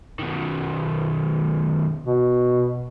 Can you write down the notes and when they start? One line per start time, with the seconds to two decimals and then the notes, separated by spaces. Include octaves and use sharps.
0.19 B2 D#3
2.07 B2